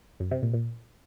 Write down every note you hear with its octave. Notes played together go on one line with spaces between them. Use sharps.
F#2
C3
A#2
A#2